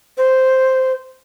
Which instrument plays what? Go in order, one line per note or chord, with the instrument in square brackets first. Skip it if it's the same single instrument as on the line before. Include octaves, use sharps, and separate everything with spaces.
[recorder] C5